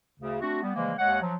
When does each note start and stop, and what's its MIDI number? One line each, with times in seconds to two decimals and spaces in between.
0.20 0.36 38
0.20 0.36 49
0.41 0.58 57
0.41 0.58 60
0.41 0.58 62
0.41 0.58 66
0.62 0.71 55
0.62 0.71 59
0.75 0.93 49
0.75 0.93 52
0.75 0.93 53
0.75 0.93 55
0.75 0.93 56
0.75 0.93 58
0.98 1.21 39
0.98 1.21 56
0.98 1.21 73
0.98 1.21 75
0.98 1.21 78
1.21 1.34 53
1.21 1.34 54